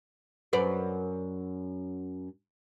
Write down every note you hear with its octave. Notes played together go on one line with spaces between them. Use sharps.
F#2 B4 D5